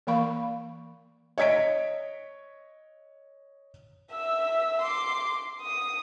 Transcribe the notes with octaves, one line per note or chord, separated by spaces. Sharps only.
E3 A#3 A#4 F5 B5 C#6
C#5 D#5 G#6 B6 D7
E5 E6
C6 D6
D#6